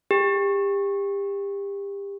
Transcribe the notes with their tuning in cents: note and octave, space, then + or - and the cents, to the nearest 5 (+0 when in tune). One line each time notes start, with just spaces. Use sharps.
G4 +30